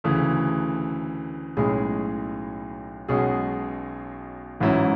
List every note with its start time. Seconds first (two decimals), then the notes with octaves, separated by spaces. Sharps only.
0.04 D2 C#3 E3 A3
1.57 B1 A2 G#3 C#4 G#4
3.09 B1 B2 G#3 C#4 G#4
4.60 A1 G#2 F#3 C#4 E4